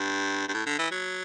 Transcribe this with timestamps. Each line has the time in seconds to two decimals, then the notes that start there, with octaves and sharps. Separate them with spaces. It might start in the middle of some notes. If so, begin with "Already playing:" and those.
Already playing: G2
0.48 G2
0.54 A2
0.66 D3
0.79 E3
0.91 F#3